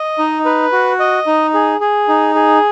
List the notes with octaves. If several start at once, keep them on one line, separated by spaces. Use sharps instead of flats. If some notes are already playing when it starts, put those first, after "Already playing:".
Already playing: D#5
D#4
B4
F#4
D#5
D#4
G#4
G#4
D#4
G#4